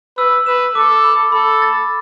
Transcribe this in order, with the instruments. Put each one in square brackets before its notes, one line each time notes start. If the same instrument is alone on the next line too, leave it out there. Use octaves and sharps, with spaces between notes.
[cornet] B4 [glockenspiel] E6
[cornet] B4 [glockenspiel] E7
[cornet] A4 [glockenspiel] D6
[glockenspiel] B5
[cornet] A4 [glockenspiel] B5
[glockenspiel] A6